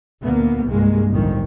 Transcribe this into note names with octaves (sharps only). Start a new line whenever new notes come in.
D2 A#2 A#3 B3
C2 G2 G#3 A#3
G1 C2 F2 A2 D3 D#3